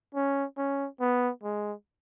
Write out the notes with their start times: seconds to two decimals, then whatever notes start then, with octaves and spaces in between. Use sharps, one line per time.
0.15 C#4
0.58 C#4
1.00 B3
1.43 G#3